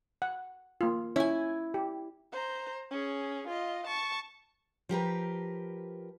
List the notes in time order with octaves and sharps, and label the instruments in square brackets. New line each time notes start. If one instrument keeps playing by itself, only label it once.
[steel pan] F#5
A#3 F4
[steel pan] C#4 C#5 [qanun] E4 G#5
[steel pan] G4
[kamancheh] C5 A#5
C#4 G#4
F4 D#5
A5 C#6
[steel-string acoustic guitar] F3 G4 A#4 B4